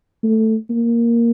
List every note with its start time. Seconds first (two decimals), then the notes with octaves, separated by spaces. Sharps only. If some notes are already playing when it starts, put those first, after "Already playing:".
0.24 A3
0.70 A#3